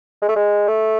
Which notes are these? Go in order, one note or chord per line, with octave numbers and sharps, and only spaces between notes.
G#3
A3
G#3
A3